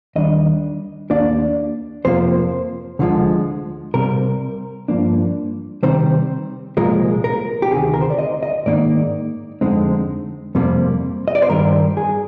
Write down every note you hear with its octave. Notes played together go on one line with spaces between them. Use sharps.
D#2 D#3 G3 D4 D#5
D#2 D#3 A#3 D4 D5
F2 C3 F3 A#3 C5
D2 D3 F3 G#3
C2 C3 G3 A#4
G2 F3 A#3 D4
C3 D#3 G3 C4 C5
C2 A#2 F3 G#3 A#4
A#4
G4
D2 C3 D#3 G#4
A#4
C5
D5
D#5
D#5
G#2 D#3 A#3 D#4 D5
F2 D3 G#3 C4 D#4
F2 C3 G3 A#3
D#5
D5
C5
G2 D#3 G3 A#4
G#4